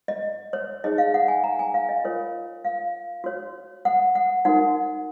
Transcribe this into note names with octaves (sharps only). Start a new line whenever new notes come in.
D#5
C#5
D#4 G#4 C#5 D#5
F5
F#5
G#5
A#5
G#5
F5
D#5
F4 A#4 C#5
F5
F#4 C#5
F#5
F#5
D#4 F#4 A#4 F#5